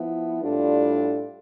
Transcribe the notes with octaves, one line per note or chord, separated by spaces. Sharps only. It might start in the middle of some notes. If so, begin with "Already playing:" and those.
Already playing: F3 B3 E4
A2 G3 D4 F4 A4